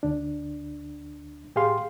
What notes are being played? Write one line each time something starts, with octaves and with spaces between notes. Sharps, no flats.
D2 D4
A2 G4 G#4 F5 C6